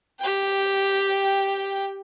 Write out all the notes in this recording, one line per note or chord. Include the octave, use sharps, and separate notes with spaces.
G4 G5